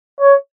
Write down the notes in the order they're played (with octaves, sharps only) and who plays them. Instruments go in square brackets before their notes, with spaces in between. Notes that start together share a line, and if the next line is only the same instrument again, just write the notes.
[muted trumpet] C#5